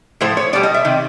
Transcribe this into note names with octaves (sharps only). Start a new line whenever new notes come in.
A2 F3 A3 C5
C#5
B2 G3 D5
D#5
E5
C3 D#3